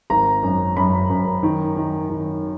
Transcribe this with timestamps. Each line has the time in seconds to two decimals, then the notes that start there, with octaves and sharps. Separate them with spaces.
0.10 G#1 A#5
0.43 F#2
0.77 F#2 B5
1.10 F#2
1.43 D#3
1.76 D#3
2.10 D#3